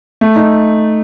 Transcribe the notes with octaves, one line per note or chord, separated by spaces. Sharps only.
A3
D#4